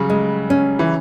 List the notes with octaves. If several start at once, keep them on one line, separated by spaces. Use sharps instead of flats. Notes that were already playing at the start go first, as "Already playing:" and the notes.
Already playing: C#3 F#3 G3 C#4
G#3
C#4
E3